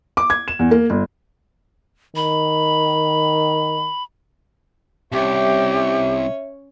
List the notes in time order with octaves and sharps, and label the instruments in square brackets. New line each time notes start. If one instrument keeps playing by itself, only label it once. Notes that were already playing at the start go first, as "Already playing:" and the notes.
[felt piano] D6
G#6
E7
E2
A#3
G1
[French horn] D#3 [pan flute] B5
[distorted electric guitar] C2 [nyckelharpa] C#4 C#5 [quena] G4 [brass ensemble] E5